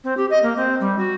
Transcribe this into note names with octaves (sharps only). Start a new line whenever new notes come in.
C4
G4
D#5
A#3
C4
G3
F#4